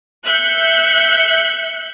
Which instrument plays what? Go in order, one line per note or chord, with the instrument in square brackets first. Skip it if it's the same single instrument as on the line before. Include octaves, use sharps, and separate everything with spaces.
[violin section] E5 F#6 G6 C#7